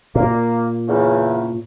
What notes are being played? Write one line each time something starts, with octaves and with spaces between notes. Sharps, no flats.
A#2 A#3
E2 C#3